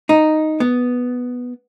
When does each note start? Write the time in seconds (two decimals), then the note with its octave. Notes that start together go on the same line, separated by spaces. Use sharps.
0.09 D#4
0.60 B3